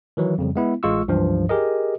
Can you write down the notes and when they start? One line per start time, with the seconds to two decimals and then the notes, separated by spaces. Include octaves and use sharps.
0.17 D#3 E3 F#3
0.38 F2 C#3 G3
0.56 G#3 B3 E4
0.83 A1 G#3 F4 C#6 E6
1.08 C#2 G2 E3 F3
1.49 G4 G#4 A#4 D#5